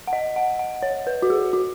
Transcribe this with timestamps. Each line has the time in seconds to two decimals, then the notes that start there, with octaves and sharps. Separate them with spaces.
0.07 F#5
0.13 D#5
0.36 F#5
0.59 F#5
0.83 C#5
1.07 B4
1.22 F#4
1.30 G#4
1.53 F#4